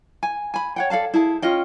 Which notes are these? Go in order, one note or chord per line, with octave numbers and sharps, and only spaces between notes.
G#5
G#5 B5
C#5 F#5 G5
A4 D5 F5 A5
E4 G#4 A5
C#4 F4 D#5 G5